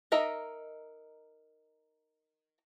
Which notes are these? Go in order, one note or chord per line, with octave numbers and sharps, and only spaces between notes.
D#4 A#4 D#5 E5